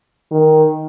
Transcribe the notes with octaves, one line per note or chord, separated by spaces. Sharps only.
D#3